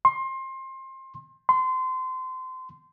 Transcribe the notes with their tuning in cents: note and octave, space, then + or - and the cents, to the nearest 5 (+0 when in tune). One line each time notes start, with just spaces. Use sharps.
C6 +25
C6 -25